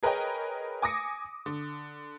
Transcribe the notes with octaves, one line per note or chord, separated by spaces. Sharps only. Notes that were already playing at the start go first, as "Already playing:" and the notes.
G#4 A#4 B4 C#5 D#5 G5
G#5 D6 D#6 A#6 C#7
D3